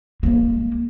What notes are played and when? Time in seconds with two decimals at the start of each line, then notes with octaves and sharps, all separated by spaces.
0.23 G#3 A#3